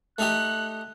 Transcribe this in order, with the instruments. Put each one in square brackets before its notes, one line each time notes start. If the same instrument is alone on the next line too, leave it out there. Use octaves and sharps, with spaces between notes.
[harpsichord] A3 D#4 G4 [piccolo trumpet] F#6